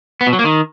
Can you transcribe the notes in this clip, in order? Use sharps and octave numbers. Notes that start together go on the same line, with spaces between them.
B3
B2
F#3
A#3
D#3